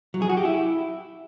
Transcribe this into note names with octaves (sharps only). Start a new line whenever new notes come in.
F#3
G#4
F#4
G4
E4